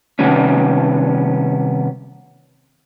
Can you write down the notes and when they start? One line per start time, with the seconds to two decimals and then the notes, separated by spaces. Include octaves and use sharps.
0.19 C3 D#3 G3 B3 C#4